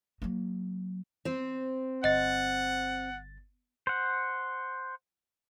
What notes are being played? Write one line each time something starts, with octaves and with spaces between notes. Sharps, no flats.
F#3 A#3
C4 C5
G1 D#5 F#5 A6
C5 F#5